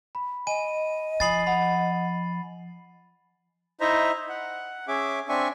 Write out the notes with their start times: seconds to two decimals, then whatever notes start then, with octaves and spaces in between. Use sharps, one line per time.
0.15 B5
0.47 D#5 G#5 D#7
1.20 F3 G#5 B5 D#6 A6 C7 F#7
1.47 F#5 B5
3.81 D#4 E4 C5 D#5 E5 A#5
4.29 F#5
4.88 C#4 G#4 E5 D6
5.29 C4 D4 E5 G#5 C#6